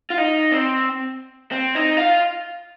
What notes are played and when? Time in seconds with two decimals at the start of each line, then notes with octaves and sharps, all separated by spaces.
0.10 F4
0.18 D#4
0.52 C4
1.52 C4
1.75 D#4
1.97 F4